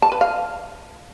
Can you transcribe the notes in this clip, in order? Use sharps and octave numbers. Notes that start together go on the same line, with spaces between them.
A5
B4
F5